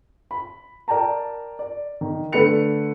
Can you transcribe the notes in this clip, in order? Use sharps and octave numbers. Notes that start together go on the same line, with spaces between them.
B5
A#4 D5 G5 A5 A#5
D5
D#3
D3 A3 B4 D5 C#7 F7